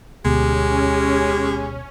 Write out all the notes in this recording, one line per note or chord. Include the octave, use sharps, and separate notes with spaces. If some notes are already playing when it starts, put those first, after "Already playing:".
D2 B2 G#3 C#4 G4